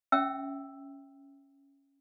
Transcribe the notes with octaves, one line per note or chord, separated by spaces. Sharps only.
C#4 E5 G5 E6